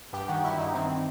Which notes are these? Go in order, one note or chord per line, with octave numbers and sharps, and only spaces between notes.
G2 G4
D#3 F#4
G2 E4
G2 D#4
D#3 C4